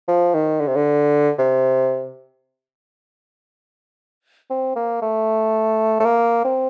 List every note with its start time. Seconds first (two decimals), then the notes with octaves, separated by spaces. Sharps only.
0.08 F3
0.34 D#3
0.60 D3
0.68 C3
0.75 D3
1.38 C3
4.50 C4
4.76 A#3
5.02 A3
6.00 A3
6.05 A#3
6.45 C4